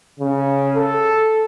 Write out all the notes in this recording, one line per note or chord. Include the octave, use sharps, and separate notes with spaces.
C#3
A4